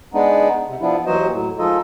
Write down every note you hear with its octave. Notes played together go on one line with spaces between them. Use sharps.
G#3 B3 D4 D#4
C3
F3 B3 D4 E4
D#2 E3 F#3 F#4 C5 D#5
A2 F#3
F3 G#3 D#4 F4 A4 D#5